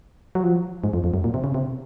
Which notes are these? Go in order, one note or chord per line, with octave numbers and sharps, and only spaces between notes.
F#3
F3
G#2
F2
F2
F#2
A#2
C3
C#3
C3